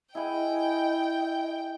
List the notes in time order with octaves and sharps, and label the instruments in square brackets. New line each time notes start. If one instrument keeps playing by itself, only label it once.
[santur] E4 G#4 F#5 [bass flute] D#5 [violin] G5